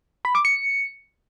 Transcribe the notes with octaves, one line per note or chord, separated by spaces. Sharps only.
B5
D6
C#7